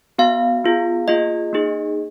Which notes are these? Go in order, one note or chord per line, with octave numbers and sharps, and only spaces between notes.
B3 F#4 F5
B3 F4 G#4
A#3 F4 G#4 D#5
A#3 D#4 G#4